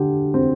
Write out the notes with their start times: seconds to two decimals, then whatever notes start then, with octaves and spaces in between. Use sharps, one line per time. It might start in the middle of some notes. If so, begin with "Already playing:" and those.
Already playing: D3 G4
0.34 C4